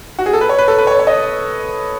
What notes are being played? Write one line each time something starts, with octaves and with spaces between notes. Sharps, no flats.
F#4
G#4
A4
B4
C#5
B4
A4
B4
C#5
C#5
D#5